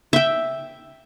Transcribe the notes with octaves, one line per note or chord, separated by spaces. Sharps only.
E5 G5